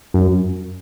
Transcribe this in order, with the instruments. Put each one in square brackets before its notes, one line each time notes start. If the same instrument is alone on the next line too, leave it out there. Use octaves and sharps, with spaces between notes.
[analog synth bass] F#2